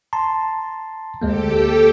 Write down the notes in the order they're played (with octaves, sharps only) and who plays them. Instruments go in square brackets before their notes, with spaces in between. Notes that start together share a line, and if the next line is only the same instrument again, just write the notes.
[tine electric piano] A5 A#5 C6
[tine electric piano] D2 G#3 A#3 [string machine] G4 A4 G5